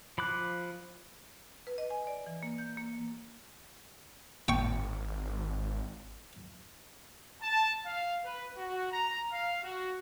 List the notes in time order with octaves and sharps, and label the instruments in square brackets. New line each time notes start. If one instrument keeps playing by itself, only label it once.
[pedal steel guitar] F3 B5 D6 F#6
[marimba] B4
D#5
G#5
D5
E3
A#3
G6
A#3
[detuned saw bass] G#1 [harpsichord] G5 C#6
[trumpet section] A5
F5
B4
F#4
A#5
F5
F#4